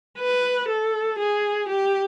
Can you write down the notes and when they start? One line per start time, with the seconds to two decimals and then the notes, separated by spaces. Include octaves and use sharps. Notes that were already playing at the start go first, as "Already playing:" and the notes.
0.18 B4
0.68 A4
1.18 G#4
1.69 G4